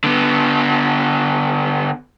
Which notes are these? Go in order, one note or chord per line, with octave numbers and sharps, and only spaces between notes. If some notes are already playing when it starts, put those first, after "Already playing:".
D3 B3